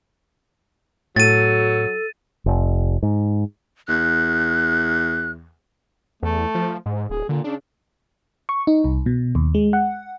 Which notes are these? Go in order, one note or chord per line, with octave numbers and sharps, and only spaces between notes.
A2 F#3 A4 A6 D#7
F1
G#2
E2 F#6
E2 A3
F3
G#2
D1 G#4
A#2 D3
C#3 D4
C#6
D#4
C2
B2
D#2
G#3
F#5